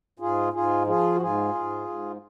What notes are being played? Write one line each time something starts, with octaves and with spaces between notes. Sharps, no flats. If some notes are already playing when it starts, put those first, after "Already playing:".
G#2 F4 G#4
G#2 F4 G#4
F3 F4 G#4
F#4
G#2 F4 G#4
G#2
G#2